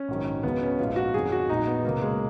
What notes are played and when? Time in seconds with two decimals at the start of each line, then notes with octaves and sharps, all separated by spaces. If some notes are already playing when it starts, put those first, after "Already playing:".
Already playing: C#4
0.08 A#1 G#2 D#3 F#3
0.43 C#2 C#3 F#3 B3
0.61 C#4
0.79 A#1 G#2 F3 F4
0.96 F#4
1.14 F2 D#3 F#3 G#4
1.32 F#4
1.49 A#1 A#2 F#3 D#4
1.67 B3
1.84 C#2 B2 F#3 A#3
2.02 G#3